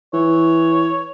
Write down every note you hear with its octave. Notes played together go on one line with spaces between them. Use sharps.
E3 C#5